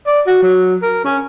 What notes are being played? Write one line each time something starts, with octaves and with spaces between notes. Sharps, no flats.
D5
F#4
F#3
A#4
C#4